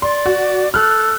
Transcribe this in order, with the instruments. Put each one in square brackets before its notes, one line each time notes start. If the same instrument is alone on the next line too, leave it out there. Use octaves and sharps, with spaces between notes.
[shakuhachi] D5 [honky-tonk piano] C6
[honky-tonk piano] F#4
[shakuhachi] A4 [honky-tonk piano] F6 F#6